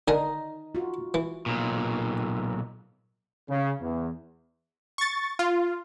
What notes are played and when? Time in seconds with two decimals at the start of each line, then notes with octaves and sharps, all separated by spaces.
0.08 D3 D#4 A#4 G#5
0.75 F4 F#4
1.14 E3
1.46 B1 A#2
3.49 C#3
3.80 E2
4.98 C#6 A6
5.39 F4